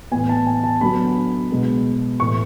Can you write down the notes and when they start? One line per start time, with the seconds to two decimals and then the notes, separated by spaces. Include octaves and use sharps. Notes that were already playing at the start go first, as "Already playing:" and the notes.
0.11 A2 E3 B3 G#5
0.29 A5
0.46 G#5
0.64 A5
0.81 D3 F#3 B3 B5
1.51 B2 G#3 B3
2.20 A2 E3 A3 C#6